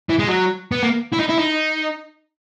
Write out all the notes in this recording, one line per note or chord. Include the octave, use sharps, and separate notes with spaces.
E3
G#3
F#3
B3
A#3
E4
D#4
E4
D#4